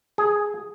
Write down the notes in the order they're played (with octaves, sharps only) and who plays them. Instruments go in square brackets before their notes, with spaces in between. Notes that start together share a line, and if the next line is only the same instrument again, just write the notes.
[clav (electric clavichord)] G#4